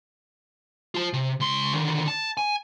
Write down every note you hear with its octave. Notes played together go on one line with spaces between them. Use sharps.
F4 A5
C3
C#2 C6
D3 D#3
A5
G#5